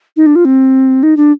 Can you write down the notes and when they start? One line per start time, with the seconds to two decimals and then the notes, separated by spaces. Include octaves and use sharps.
0.16 D#4
0.26 D4
0.35 F4
0.45 C4
1.03 D#4
1.17 D4